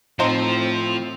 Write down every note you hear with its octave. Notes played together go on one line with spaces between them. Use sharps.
A2 F3 C4 D#4 C5 A#5